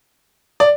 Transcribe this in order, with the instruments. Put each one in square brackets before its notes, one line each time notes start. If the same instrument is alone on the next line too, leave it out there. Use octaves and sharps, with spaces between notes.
[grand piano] D5